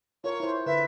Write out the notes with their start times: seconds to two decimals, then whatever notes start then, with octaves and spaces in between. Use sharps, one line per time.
0.24 F4 A#4 C#5
0.40 E4 C5
0.66 D3 B4 E5